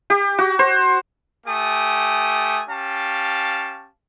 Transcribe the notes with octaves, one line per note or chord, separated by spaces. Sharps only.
G4
F#4
C5
A3 G4 G#5 D#6
C#4 G4 F5 A5